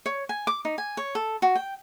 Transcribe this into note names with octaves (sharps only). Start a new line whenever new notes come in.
C#5
G#5
D6
D#4
G#5
C#5
A4
F#4
G5